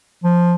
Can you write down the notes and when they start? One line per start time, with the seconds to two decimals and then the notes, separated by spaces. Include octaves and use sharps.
0.24 F3